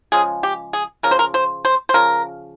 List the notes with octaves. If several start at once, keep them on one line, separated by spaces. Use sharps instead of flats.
C#3 F3 G#3 G#4
G4
G#4
C#3 F3 A#4
C5
A#4
C5
C5
C5
C#3 F3 A#4